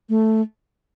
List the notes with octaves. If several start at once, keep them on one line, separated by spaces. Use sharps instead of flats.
A3